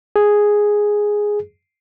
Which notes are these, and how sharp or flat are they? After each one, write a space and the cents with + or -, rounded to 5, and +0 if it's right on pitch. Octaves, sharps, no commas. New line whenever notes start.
G#4 +0